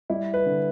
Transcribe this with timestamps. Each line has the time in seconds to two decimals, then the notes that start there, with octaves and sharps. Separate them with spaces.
0.10 G3 E4
0.34 B4
0.46 D3